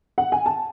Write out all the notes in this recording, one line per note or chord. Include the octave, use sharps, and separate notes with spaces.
F#5
G#5
A5